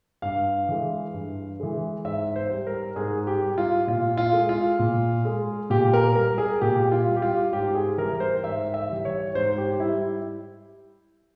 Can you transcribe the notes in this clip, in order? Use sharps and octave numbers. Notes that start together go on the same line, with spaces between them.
G2 F5
E3 G#3
G2
E3 G#3
G#2 E5
C5
G3
A#4
G#2 G#4
G4
G3
F4
A#2 F4
F4
G#3
F4
A#2
G#3
A#2 G4
A#4
G3 A#4
G#4
A#2 G4
F4
G3
G4
F4
G#2 G4
G#4
E3 G3 A#4
C5
G#2 E5
E5
E3 G3
C#5
G#2 C5
G4
G3 E4